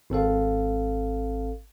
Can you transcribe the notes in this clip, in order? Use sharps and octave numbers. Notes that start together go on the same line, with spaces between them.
G#1 C4 A4 F5